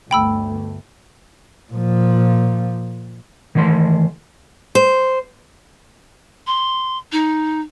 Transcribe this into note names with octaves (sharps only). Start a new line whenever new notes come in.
G1 D2 A3 G5 B5 E6
A#2 F3
D#3 E3 A3 E5 C6
C5
C6
D#4